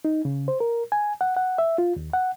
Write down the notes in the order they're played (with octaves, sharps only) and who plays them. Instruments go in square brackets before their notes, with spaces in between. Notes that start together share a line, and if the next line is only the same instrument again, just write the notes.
[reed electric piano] D#4
C#3
C5
A#4
G#5
F#5
F#5
E5
F4
D#2
F#5